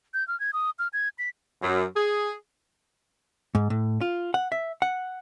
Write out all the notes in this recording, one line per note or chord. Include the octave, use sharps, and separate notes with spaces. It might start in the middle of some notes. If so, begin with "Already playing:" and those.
G6
F6
G#6
D#6
F6
G#6
B6
F#2
G#4
G#2
A2
F4
F#5
E5
F#5